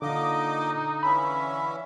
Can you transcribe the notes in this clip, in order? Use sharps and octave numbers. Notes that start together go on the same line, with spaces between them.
A#2 D3 D#4 D#5 F5 D6
E3 C#4 E5 B5